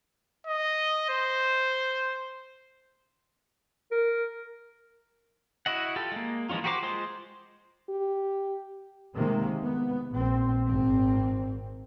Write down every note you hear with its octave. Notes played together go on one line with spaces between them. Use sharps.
D#5
C5
A#4
E4 F#4 D#5 F#5
F4 G4 A4
G#3 A#3
E3 F3 G#3 C#4 F4
F#4 G4 A#4 C5 D6
G#3 F4 C5 C6
G4
C3 D#3 G#3 A#3
B3
A#1 C4
G#1 C4